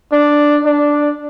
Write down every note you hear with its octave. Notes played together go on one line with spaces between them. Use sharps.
D4
D4